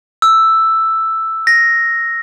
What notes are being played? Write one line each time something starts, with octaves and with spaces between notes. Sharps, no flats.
E6
A#6